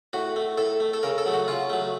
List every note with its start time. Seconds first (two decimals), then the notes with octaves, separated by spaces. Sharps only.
0.13 A2 F#4
0.36 A3
0.58 A2 A4
0.80 A3
0.93 A4
1.03 C#3 A#4
1.18 A4
1.26 F#3 A3
1.33 F#4
1.48 C#3 F4
1.70 F#3 A3